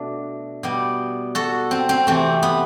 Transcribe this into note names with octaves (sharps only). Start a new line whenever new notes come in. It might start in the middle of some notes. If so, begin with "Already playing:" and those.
Already playing: B2 A3 D4
B2 G3 B3
F#4 A4
C4
C4
C3 E3 A3 C4
B3